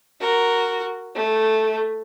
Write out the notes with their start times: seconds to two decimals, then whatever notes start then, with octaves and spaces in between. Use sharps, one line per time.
0.21 F#4 A#4
1.15 A3